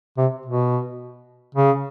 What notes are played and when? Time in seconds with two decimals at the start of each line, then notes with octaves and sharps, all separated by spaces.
0.18 C3
0.46 B2
1.55 C#3